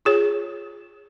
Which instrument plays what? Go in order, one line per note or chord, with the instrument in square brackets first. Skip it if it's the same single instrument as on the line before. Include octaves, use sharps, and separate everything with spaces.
[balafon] F4 G#4 C#5